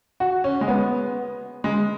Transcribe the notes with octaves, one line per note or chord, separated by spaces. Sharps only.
F#4
C#4
G#3
B3
G#3